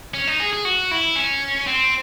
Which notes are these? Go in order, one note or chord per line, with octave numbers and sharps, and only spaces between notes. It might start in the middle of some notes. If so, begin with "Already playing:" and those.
C#4
D#4
G#4
G#4
F#4
E4
C#4
C4